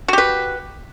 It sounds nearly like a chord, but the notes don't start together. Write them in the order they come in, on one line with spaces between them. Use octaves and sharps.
F#4 G4 B4